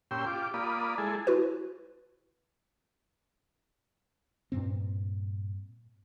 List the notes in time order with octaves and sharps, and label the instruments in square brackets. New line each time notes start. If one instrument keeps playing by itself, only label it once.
[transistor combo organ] A#2 C#4 G4 G5 C6 E6
F4 G4 D6
A#3 F4 D5 B5 D#6
G#3 E4 G#4 A4
[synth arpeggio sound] E4 F#4 B4
[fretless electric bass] G2 A#2 C4